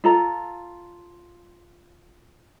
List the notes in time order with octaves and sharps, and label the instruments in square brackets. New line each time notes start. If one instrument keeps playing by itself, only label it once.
[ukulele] F4 A4 A#5